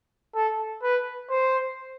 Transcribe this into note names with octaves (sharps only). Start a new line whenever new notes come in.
A4
B4
C5